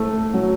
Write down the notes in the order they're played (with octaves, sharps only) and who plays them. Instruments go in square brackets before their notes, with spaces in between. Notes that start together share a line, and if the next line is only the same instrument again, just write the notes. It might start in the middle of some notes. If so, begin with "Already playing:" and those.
Already playing: [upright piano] A3
F#3